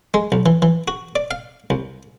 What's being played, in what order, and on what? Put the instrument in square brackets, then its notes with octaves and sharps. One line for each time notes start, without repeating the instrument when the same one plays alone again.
[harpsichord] G#3
B1
E3
E3
F#4
D5
F5
C2